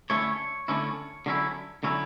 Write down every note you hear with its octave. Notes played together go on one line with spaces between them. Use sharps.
D3 A3 C#4 E4 C#5
D3 A3 C#4 E4
D3 F#3 C#4 E4
D3 F#3 C#4 E4